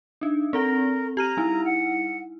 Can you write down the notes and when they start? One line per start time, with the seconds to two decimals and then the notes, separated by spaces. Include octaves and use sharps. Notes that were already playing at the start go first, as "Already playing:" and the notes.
0.21 D4 D#4
0.53 C4 A4 A#4 F#5
1.17 G4 A#5 F6 D#7
1.37 G3 D#4 E4
1.65 F#5